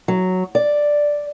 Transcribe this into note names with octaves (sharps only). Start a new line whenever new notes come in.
F#3
D5